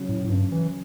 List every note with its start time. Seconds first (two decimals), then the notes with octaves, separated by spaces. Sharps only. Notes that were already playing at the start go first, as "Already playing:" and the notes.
Already playing: C#3 F#3 C#4
0.09 A2
0.24 A2
0.30 G2 C#3
0.52 E3